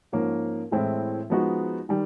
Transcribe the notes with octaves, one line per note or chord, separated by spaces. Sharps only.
G#2 F3 A#3 C#4
A2 E3 G#3 C4 E4
F3 G#3 B3 D#4 F#4
D#3 G3